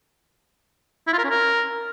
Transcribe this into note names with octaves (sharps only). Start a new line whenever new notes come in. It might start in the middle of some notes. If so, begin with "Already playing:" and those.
E4
F4
A#4
C#4
A#4